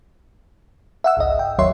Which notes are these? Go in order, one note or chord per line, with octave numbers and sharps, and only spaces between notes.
E5 F#5 E6
G#1 C#2 D#5
G5
G1 D#2 F#3 C#5 E5 C6